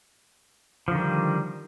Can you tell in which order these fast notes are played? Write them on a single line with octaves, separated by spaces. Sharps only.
F3 D3 D#3 G3